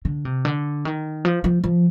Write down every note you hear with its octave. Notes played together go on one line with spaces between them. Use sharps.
D3
C3
D3
D#3
F3
F3
F3